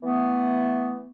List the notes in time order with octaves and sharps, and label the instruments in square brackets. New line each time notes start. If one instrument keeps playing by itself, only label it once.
[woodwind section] E3 A3 B3